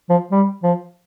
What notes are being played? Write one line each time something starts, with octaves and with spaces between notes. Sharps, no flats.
F3
G3
F3